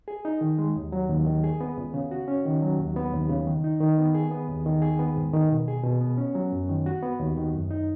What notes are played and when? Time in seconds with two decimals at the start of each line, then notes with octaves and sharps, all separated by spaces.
0.08 G#4
0.25 D#4
0.41 D#3
0.59 G#3
0.76 D#2
0.92 F#3
1.09 D#2
1.27 D#3
1.44 G#4
1.61 B3
1.77 C#2
1.94 C#3
2.11 F#4
2.28 C#4
2.46 D#3
2.62 F#3
2.79 D#2
2.96 B3
3.13 D#2
3.30 C#3
3.47 D#3
3.64 D#4
3.81 D#3
3.98 B3
4.14 G#4
4.31 B3
4.48 D#2
4.66 D#3
4.82 G#4
4.99 B3
5.16 G#2
5.33 D#3
5.50 B2
5.68 G#4
5.84 B2
6.01 B3
6.18 C#4
6.35 F#3
6.52 F#2
6.69 D#3
6.86 F#4
7.03 B3
7.20 D#2
7.37 D#3
7.53 F#2
7.71 D#4